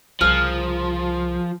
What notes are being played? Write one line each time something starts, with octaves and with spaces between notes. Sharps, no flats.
C2 C#3 F3 G#4 A#4 F6